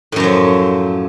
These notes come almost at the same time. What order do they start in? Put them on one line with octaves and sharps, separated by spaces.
A2 F#2 F#3 F3